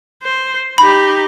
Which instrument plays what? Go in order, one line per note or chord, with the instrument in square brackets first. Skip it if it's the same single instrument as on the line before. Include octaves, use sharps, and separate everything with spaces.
[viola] C5
[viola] D#4 G4 [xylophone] B5